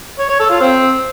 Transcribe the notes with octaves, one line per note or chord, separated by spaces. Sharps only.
C#5
C#5
A4
F4
C4